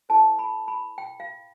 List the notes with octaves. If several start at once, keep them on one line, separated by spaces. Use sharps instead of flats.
E4 A4 C5 A5
B5
B5
G5
F5